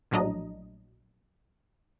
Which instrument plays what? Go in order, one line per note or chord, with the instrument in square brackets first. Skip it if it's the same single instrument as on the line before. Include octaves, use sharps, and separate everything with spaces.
[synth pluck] A#1 A2 F#3 D4 D#5 A#5